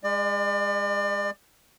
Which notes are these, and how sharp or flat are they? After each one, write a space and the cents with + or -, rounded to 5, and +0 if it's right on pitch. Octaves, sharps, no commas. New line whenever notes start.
G#3 -25 D5 +35